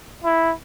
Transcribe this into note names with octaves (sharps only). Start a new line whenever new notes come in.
E4